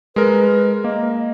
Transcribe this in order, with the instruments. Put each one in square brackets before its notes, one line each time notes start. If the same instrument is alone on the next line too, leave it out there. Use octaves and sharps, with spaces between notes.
[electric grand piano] G#3 A#4 [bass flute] B4
[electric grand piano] A#3 [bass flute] D#5